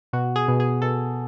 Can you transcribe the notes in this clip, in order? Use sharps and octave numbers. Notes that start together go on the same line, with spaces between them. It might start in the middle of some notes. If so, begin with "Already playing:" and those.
B2 F#4
G#4
B2
G#4
B2 A4